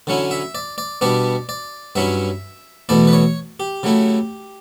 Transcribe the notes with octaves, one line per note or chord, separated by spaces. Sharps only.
D3 F#3 C#4 E4
E5
D5
D5
B2 G3 B3 D4 D5
D5
G2 F#3 C#4 E4 E5
E2 B2 A3 E4 D5
B4
C#5
G4
C#3 F#3 A3 E4